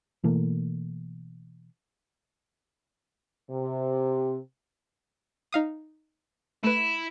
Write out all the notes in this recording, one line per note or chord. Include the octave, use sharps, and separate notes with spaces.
B2 E3 A3 A#3
C3
D#4 F5 D#6
A3 E4 B4